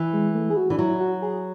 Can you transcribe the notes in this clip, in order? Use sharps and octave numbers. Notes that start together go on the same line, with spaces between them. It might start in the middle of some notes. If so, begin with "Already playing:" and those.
Already playing: E3
G#3
A3
G#4
F#4
E3 D4
F#3 E4
F#4
G#4